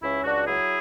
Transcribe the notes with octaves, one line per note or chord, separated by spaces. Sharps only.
C#2 C#4 E4
C#2 D4 F#4
F#3 E4 G#4